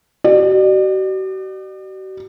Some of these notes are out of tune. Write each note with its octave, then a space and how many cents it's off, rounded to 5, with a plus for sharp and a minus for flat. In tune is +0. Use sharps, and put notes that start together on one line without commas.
F#4 +45 D5 +40